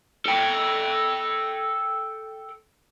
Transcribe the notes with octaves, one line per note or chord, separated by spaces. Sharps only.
A4 G5